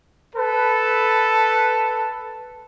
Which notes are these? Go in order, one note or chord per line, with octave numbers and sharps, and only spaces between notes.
A4 B4